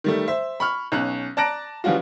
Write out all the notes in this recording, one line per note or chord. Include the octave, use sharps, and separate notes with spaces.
D#3 G3 A3
C5 E5
B5 C#6 F6
B1 C#4 F#6
D5 A5 A#5 F#6 A#6 D7
E3 F3 G3 C#4 F4 F#4